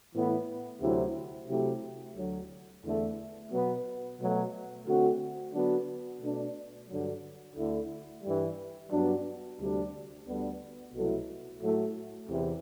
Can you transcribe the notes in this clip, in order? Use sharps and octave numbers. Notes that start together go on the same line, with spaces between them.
A2 E3 B3 E4
D2 C3 F#3 C4 E4
C3 F#3 A3 E4 G4
D2 D3 F#3
E2 D3 A3
B2 F#3 B3
B2 F#3 A3
D3 A3 C4 F#4
D3 F#3 B3 D4 F#4
B2 A3 D4
G2 D3 F#3
D2 D3 A3 E4
G2 E3 G3
G2 F#3 B3 D4
D2 C3 G3 D4
D2 D3 G3 B3 D4
C2 B2 F#3 A3 E4
A2 F#3 A3
E2 C3 E3